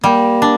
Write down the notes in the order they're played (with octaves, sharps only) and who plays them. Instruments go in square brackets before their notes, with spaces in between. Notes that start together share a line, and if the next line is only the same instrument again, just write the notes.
[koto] G3 [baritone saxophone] A#3
[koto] D4